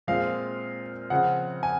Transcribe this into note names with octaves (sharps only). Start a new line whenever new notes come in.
A#2 G#3 C4 F5
C#3 F3 C4 F#5
G#5